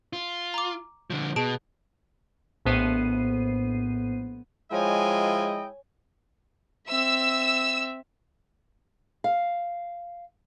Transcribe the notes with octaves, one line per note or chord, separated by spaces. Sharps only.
F4
A#5 D6
D3 F3
B2 G#4 A5 D7
A#1 A2 B3 C5 C7 D#7
F3 G#3 E4 C#5 D#5 G5 G#5
C4 E5 E6
F5